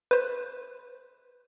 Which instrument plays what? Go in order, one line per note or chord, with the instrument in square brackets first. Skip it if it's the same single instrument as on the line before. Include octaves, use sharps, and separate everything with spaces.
[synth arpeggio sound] B4 C5